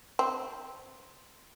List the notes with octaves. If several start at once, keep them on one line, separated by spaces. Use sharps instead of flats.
C4